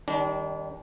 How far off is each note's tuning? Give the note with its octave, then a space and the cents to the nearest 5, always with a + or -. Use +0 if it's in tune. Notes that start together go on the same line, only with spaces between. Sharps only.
D#3 -5 G3 +0 D4 -40